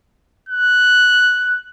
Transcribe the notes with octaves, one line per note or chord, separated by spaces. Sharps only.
F#6